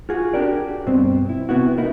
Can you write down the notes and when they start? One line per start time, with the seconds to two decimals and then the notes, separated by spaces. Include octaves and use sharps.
0.09 F4 F#4 G#4
0.34 D4 D#4 F#4 G4 A#4 D5
0.86 G2 B2 C4
1.29 E4
1.49 C3 B3 E4 F#4
1.78 A#3 D#4 E4